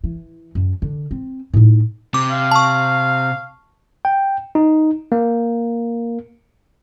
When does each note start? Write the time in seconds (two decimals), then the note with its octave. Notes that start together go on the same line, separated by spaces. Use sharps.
0.04 E3
0.55 F#2
0.82 D3
1.11 C4
1.54 A2 D#4
2.14 C3 D6
2.31 F5
2.51 A5 C#6
4.05 G5
4.55 D#4
5.12 A#3